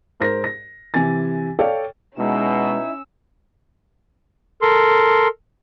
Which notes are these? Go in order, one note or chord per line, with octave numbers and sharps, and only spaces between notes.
G#2 A#4 C5 A#6
A#6
C3 E3 G#5 A6
A4 C#5 D5 F5 G5
B2 G#3 C#4 D#4 E4 E6
A4 A#4 C6